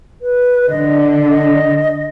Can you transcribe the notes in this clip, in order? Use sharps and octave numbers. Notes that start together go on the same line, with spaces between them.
B4
D3 D#5
D#5